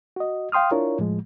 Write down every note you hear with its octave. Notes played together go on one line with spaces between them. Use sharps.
F#4 D#5
F5 G5 C6 D#6 F6
D4 E4 F4 A#4 C#5
A2 F3 G#3